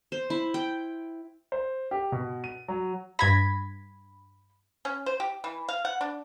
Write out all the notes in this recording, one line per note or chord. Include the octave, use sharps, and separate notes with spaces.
C5
E4
G5
C5
G4
B2
D#7
F#3
G2 B5 G#6 A#6
C#4
C5
G4
E3
F5
F#5
D4